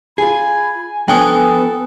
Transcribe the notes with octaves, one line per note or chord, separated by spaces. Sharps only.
F4 G#4 G#5 B5
F3 B3 D4 A4 C#5 G5 G#5 D#6